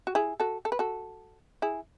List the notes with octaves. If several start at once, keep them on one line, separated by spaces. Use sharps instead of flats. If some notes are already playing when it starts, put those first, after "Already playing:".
F#4
E4 G#4
F#4 A4
A4
B4
F#4 A4
E4 G#4